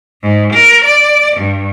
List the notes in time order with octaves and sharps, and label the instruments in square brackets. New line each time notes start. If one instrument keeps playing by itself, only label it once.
[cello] G#2
A#4
D5
G2